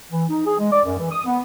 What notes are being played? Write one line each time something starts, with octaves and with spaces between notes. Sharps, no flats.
E3
D#4
G#4
G#3
D5
F#2
E3
D#6
B3